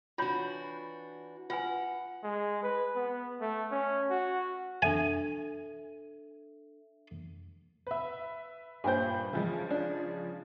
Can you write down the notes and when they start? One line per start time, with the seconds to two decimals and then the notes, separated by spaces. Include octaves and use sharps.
0.18 E3 D4 F4 F#4 C#5 B5
1.50 F4 B4 F#5 G#5
2.24 G#3
2.63 B4
2.96 B3
3.41 A3
3.71 C#4
4.10 F#4
4.82 D4 A4 E5 G#5
7.87 B4 E5
8.84 G2 A#2 C5 G5 G#5 G6
9.33 C#3 E3 F3 G#3
9.70 D4